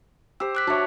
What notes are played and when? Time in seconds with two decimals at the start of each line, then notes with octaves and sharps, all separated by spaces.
0.40 G4 C5 E6
0.55 D6 F#6 B6
0.67 D4 F#4 C#5 E5